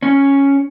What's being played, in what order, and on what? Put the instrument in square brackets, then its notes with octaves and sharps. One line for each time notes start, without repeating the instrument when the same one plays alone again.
[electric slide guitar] C#4